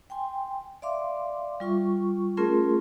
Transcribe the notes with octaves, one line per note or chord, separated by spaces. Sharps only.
G5 G#5 C6
D5 E5 F5 C6 D6
G3 F4 C#6
A3 C#4 F4 G#4 A#4 C6